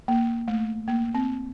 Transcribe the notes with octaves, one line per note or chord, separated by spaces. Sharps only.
A#3
A3
A#3
C4